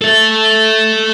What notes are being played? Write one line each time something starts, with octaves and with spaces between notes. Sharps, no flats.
A4 E5